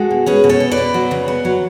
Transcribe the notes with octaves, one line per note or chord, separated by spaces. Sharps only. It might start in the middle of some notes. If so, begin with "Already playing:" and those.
Already playing: G#3 F#4 A4
B2
C#4 G#4 B4
B2
A4 C#5
B2
B4 D5
B2
F#3
C#3
B3
F#3